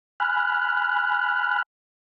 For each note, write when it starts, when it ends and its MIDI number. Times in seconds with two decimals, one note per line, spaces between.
0.20 1.62 80
0.20 1.62 83
0.20 1.62 89
0.20 1.62 90